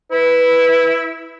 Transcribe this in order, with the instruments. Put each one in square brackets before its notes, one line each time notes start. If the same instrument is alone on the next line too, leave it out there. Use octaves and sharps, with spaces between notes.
[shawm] E4 [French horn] B4